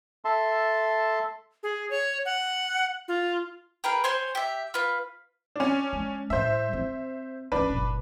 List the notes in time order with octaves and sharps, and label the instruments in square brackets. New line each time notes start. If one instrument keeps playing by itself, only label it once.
[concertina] A4 E5 A5 C6
[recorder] G#4
C#5
F#5
F4
[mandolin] G#4 A#4 B4 G5
C5 C#5 G#5 C6
G4 E5
F4 B4
[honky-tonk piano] C#4 D4
[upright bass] G#3
[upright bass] A2 G3 [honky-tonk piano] C5 E5
[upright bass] C4
[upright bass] D1 C#4 [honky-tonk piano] D4 B4
[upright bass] F#1 A#2